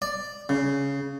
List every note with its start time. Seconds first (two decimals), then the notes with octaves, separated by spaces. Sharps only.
0.02 D5
0.49 C#3